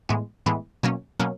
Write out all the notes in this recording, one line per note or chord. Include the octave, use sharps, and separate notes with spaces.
A2 E3 G#3 B3
A2 E3 G#3 B3
B2 F#3 A#3 C#4
B2 F#3 A#3 C#4